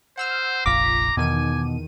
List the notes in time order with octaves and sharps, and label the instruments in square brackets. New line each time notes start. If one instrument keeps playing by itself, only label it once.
[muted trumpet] C5 [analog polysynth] F#5 E6 F6
[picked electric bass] F1 A#1 [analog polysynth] F4 B6 [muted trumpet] A#5 [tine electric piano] D6
[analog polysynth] E2 D#3 D#7 [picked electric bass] B2 [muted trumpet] G#5